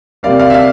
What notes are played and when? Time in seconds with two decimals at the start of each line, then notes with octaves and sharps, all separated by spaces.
0.23 C3 G3 A#3 D5 F5
0.39 D5 F5
0.50 E5
0.54 D5 F5